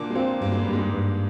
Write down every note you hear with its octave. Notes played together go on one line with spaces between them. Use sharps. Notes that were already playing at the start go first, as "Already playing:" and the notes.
Already playing: A#2 D3 A#3 D4
G#3
A#2 A#3 C4
G2 A#3
G#3
G3
G2
G#2 G#3
G2